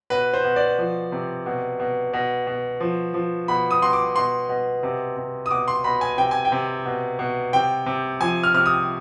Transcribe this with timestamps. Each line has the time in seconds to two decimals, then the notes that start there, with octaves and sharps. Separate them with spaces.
0.10 B2 B4
0.34 C5
0.44 B2
0.56 D5
0.78 F3
1.12 C3
1.46 B2
1.80 B2
2.13 B2
2.47 B2
2.80 F3
3.14 F3
3.48 B2 B5
3.71 D#6
3.82 B2 C6
3.93 D6
4.16 B2 C6
4.49 B2
4.83 C3
5.17 C3
5.46 D#6
5.51 B2 D6
5.68 C6
5.84 B2 B5
6.01 G#5
6.18 C3 G5
6.31 G#5
6.45 G5
6.52 C3
6.85 B2
7.19 B2
7.53 C3 G5
7.86 C3
8.20 F3 G#5
8.43 F6
8.54 C3 F6
8.66 D#6